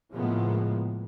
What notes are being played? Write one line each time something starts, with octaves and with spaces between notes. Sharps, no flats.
A2 C#3 F3 G#3 A#3 B3